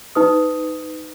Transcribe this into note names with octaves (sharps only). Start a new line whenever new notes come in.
D#4 B4 D#6